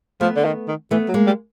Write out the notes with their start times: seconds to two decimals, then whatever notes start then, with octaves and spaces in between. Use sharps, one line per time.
0.21 F3 A3 B3
0.36 D3
0.45 D#3
0.68 D#3
0.91 E3 A3 B3
1.08 F#3
1.14 G#3 A#3
1.26 G3